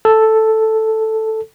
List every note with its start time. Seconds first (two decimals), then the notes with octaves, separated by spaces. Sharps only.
0.05 A4